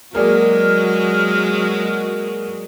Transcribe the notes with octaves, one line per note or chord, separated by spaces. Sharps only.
F#3 G#3 A#3 F#4 G#4 D5 F6